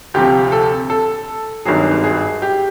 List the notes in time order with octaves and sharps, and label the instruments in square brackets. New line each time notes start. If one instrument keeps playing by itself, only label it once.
[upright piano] D2 C3 F3 G4
A4
A4
G#1 G2 D#3 F#3 G#4
G#4
G4